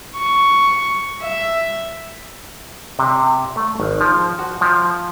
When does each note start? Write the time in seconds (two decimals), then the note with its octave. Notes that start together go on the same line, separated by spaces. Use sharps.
0.16 C#6
1.22 E5
2.99 C3
3.56 A3
3.80 G#1
4.01 F3
4.39 F#4
4.61 F3